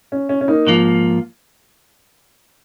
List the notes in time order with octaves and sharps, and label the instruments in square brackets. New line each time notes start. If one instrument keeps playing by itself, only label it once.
[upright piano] C#4
C#4
C#4
A#3 D#4
[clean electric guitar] G#2 F3 A#3 F4